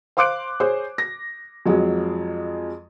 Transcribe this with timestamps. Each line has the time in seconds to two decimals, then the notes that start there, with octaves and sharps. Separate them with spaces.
0.17 C5 F5 C6 D6 F#6 D7
0.60 G#4 C5 C#5
0.98 A#6
1.66 F2 F#3 G#3